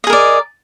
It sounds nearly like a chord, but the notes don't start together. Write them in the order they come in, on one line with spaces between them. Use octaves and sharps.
D#5 G#4 A#4 D5